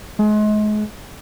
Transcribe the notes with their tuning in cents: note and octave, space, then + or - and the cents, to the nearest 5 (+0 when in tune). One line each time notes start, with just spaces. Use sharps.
G#3 +35